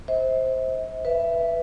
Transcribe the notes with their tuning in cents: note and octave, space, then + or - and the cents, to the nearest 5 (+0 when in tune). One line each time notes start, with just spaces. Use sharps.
C5 +5 E5 -40
B4 +0 E5 +20